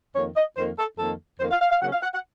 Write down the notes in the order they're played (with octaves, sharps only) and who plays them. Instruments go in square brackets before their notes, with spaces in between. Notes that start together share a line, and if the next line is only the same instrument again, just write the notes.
[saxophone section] F2 D#3 A#3 C#5
D#5
F2 D#3 A#3 C5
A4
F2 D#3 A#3 A4
F2 D#3 A#3 C5
F5
F5
F5
C#3 F#3 A#3 C#4 F#5
F5
F#5
F#5